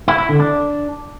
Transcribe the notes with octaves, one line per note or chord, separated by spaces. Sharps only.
E4
E4
D3
D4